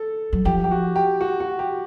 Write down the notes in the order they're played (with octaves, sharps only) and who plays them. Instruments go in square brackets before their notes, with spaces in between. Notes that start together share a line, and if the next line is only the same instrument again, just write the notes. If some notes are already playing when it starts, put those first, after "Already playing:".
Already playing: [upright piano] A4
[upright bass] F#3
[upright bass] F3 [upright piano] G4
[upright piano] G4
F#4
G4
F#4
F#4
G4